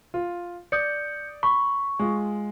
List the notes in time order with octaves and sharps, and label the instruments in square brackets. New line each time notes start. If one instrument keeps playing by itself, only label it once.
[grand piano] F4
[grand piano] D5 [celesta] D#6 G6 C#7
[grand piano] B5 [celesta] C#6
[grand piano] G#3 F4